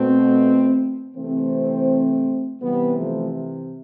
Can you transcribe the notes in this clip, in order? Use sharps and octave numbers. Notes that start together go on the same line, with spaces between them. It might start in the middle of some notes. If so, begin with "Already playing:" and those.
Already playing: B2 A3 C4
C3 E3 A3 C4
C3 E3 G3 B3
F3 A3